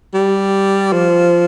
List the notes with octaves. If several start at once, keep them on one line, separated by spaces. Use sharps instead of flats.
G3
F3